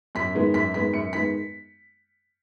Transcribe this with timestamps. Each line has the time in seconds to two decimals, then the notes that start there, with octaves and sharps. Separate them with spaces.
0.15 F#2 B6
0.35 D#3 G#3 B3
0.54 F#2 B6
0.74 D#3 G#3 B3 B6
0.94 F#2 C#7
1.13 D#3 G#3 B3 B6